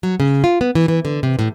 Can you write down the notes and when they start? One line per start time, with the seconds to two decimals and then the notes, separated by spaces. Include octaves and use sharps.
0.03 F#3
0.20 C#3
0.44 F4
0.61 B3
0.75 E3
0.88 E3
1.05 D3
1.23 C3
1.39 A2